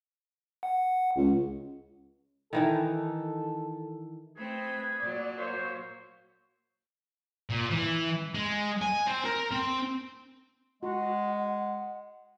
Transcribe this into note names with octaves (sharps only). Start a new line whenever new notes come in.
F#5
C#2
D#3 E3 D#4 A4
A3 C4 G#4 B4 B5
A#2 F#3 D5
A#3 C5 C#5
A#2
E3
G#3
G#5
C4
A#4
C4
G#3 F#4 F#5